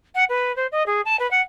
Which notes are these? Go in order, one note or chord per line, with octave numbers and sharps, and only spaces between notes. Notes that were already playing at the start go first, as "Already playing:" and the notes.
F#5
B4
C5
D#5
G#4
A5
B4
F#5